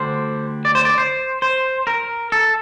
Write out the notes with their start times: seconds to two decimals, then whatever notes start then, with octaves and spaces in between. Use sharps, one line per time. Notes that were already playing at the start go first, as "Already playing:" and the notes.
Already playing: D2 D3 G3 D4 C5
0.65 D5
0.75 C5
0.85 D5
0.98 C5
1.42 C5
1.87 A#4
2.32 A4